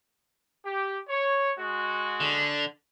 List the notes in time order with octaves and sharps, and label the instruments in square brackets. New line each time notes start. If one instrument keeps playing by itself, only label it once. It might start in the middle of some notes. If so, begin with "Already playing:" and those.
[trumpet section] G4
C#5
G#3 F#4
[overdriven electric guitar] D3